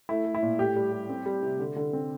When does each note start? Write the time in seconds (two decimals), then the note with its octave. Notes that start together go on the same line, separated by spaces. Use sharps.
0.09 A3 E4
0.26 A3
0.35 E4
0.43 A#2
0.59 A2 G4
0.76 G3
0.92 G3
1.09 C4
1.26 G3
1.43 C3
1.59 D3
1.76 D3
1.93 C4